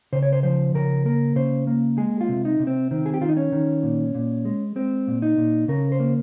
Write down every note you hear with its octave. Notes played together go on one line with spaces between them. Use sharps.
C#3 C5
C#5
C5
F3 C5
C#3 A#4
A#3 A#4
C#3 C5
A#3
G#3 G#4
F4
C3
D#4
C3
C4
D#3 C4
G#4
G4
D#3 F4
D#4
C#4
D#3
A#2
A#2
G#3
G#3 C4
A#2
D#4
A#2
C#3 A#4
C5
A#3